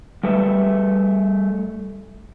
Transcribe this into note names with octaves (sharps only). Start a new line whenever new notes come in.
G3 A3 B4 E5